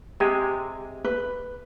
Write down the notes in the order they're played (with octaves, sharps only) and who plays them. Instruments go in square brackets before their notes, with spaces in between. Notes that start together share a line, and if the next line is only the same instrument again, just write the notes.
[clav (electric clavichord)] C3 G#3 G#5 [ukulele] G4
[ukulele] B4